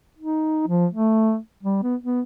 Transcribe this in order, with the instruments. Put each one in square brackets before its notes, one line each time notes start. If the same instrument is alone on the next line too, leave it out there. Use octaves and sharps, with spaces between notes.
[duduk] D#4
F3
A3
G3
B3
B3